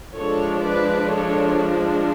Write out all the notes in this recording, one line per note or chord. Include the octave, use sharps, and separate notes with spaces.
F3 G#3 D4 A4 C#5
B4 D5
A4 C#5